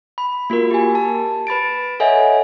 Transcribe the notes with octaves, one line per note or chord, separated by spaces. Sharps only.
B5
A#3 F4 F#4 A#4
G4 G#5
A5
B4 B5 A6 D7
A4 C#5 D#5 E5 F#5 G#5